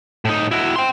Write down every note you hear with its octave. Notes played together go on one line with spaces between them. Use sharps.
A2 D#4
E4 F#4
G5 C6